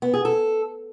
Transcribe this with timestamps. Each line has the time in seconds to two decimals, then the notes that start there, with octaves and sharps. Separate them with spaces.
0.02 B3
0.14 G#4
0.25 A4